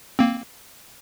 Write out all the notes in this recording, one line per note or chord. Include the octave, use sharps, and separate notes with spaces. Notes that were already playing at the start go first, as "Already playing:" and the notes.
A#3 C4